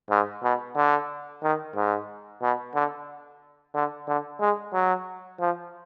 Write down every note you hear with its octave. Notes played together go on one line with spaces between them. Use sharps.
G#2
B2
D3
D#3
G#2
B2
D3
D3
D3
G#3
F#3
F3